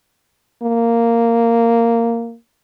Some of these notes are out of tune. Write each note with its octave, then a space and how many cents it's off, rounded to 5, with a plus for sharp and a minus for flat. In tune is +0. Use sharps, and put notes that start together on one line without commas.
A#3 -10